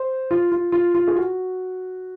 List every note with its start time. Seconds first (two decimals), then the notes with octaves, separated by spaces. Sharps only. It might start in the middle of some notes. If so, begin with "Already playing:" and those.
Already playing: C5
0.31 F4
0.52 F4
0.72 F4
0.95 F4
1.07 G#4
1.16 F#4